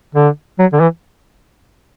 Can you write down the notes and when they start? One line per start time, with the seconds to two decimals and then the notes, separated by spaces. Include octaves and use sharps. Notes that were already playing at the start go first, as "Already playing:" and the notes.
0.15 D3
0.59 F#3
0.73 D3
0.80 E3